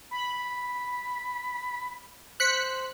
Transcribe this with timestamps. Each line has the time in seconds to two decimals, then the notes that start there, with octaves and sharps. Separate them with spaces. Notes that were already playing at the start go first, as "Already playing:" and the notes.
0.11 B5
2.40 C5 F#6 B6 C#7